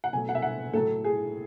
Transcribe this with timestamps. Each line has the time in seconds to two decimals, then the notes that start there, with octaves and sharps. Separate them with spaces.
0.04 F#5
0.13 B2 F#3 A3 G#5
0.29 F#5
0.35 E5
0.42 F#5
0.73 A2 F#3 A3 A4
1.04 G#4